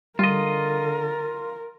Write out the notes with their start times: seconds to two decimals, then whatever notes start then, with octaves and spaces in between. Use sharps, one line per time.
0.19 D3 G3 F4 A#4 D#5